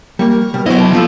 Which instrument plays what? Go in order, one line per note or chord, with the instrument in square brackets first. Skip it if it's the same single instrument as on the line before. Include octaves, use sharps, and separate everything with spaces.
[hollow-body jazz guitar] G3 A#3 [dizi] A#4 [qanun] C#6
[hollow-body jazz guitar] B2 G3
[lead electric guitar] F#3 D#5 [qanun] B3 [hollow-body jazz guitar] E4 F#4 D5 [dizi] C5
[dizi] A5
[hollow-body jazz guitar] A#2 [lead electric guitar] F3 [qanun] C#4 F4 A4